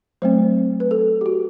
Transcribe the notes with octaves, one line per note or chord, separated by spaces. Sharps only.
F#3 A3 C4 C5
B4
A4
G4
F#4